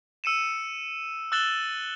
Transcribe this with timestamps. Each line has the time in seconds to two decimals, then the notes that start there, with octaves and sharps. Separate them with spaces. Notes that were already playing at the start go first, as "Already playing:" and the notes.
0.24 E6 C#7 D#7 E7
1.32 E6 F#6 A6 E7 F#7 G7